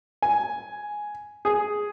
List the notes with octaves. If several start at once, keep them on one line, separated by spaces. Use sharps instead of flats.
G#5
G#4